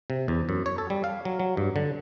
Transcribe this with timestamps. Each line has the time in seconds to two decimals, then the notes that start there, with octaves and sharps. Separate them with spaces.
0.10 C3
0.28 E2
0.49 F#2
0.66 C#5
0.78 A4
0.90 G3
1.04 F5
1.25 F#3
1.39 F#3
1.57 G2
1.76 D3